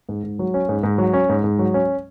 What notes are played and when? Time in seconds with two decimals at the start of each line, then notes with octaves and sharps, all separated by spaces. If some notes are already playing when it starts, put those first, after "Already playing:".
0.09 G#2
0.23 G#2
0.39 F#3
0.54 C#4
0.69 G#2
0.83 G#2
0.98 F#3
1.13 C#4
1.29 G#2
1.44 G#2
1.59 F#3
1.74 C#4